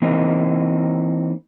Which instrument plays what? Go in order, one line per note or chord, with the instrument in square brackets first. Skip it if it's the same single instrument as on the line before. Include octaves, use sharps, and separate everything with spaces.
[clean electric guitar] E3 A#3 C4 D#4